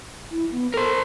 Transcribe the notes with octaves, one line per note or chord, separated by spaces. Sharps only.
E4
B3
A4 A#4 C5